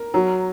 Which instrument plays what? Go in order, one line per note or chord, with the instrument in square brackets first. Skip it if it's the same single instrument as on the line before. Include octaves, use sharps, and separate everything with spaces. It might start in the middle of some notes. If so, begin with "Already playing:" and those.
Already playing: [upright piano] A#4
F#3